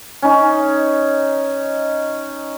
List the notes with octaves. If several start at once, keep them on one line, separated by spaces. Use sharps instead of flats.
C#4 D#4